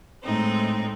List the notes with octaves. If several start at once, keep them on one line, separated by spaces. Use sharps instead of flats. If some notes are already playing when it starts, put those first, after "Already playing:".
A2 G#3 A3 C4 D#4